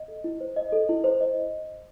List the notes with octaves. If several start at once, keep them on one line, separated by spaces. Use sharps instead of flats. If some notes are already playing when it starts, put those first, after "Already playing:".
Already playing: D#5
A4
E4
C5
D#5
A4
E4
C5
D#5